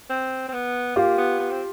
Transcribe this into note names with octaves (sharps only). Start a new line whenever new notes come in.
C4
C4
B3
A#3 F4 G4
B3
B3
C4